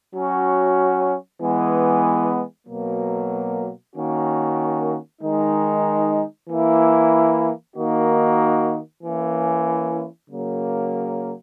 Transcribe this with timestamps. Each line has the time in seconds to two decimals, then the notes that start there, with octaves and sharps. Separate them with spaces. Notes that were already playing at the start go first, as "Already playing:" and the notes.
0.13 F#3 C#4 F#4
1.40 E3 G#3 B3
2.67 B2 F#3 A#3
3.95 D#3 A#3 C#4 F#4
5.21 D#3 G#3 D#4
6.48 E3 A#3 E4
7.76 D#3 A#3 D#4 F#4
9.03 E3 A#3 C#4 E4
10.30 C#3 F#3 A#3